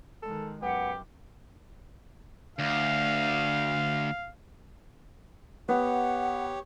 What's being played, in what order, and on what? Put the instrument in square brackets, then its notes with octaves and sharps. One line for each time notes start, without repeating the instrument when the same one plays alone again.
[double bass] D#3 G#3 [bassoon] A4
[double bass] F#2 [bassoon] B3 [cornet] G4 [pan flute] F#5
[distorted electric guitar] D2 [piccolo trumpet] F5
[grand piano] B3 [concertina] G4 C#5 [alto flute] F#5